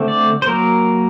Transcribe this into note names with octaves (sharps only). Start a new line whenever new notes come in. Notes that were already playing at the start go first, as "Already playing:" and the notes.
Already playing: D3 A3 C4
D5
C5
F#3 A#3 A#4